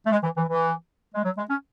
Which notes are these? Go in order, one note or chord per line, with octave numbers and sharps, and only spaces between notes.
A3
G#3
E3
E3
E3
G#3
F#3
G#3
C#4